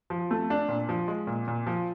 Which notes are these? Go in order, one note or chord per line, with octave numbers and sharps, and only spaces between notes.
F3
A3
D4
A#2
F3
G#3
A#2
A#2
F3